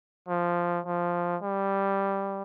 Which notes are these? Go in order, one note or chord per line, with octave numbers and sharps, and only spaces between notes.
F3
F3
G3